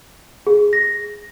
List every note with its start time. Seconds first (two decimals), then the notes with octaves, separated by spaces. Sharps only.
0.47 G#4
0.73 A#6